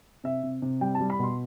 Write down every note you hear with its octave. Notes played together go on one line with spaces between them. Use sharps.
C3 E5
C3
C3
G3 G5
A5
G3
B5
B2 C6